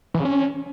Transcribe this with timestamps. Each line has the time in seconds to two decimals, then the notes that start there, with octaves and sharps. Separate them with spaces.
0.14 E3
0.20 C#3
0.25 C#4